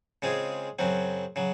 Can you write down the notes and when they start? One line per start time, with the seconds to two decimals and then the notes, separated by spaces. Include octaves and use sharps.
0.22 C#3 G#3 C4 F4 G#4
0.79 F#2 C#3 F#3 C4
1.36 C#3 F#3